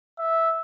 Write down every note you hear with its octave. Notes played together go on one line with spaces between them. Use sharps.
E5